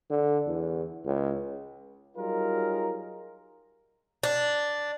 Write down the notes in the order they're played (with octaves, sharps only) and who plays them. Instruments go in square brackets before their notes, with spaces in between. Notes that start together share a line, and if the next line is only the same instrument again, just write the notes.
[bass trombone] D3
E2
C#2
[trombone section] F#3 G3 D#4 F4 G#4 A#4
[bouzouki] D4